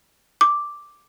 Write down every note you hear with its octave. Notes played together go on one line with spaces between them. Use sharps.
D6